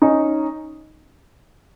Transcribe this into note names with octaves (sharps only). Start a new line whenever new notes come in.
C#4 D#4